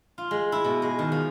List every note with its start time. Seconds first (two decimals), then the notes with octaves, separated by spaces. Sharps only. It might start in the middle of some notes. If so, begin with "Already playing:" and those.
0.18 F4
0.31 G#3
0.52 E4
0.64 B2
0.82 G#3
0.99 D#3
1.12 F3